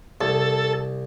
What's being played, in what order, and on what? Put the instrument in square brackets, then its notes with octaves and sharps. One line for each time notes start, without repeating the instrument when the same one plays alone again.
[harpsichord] C2 [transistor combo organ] A4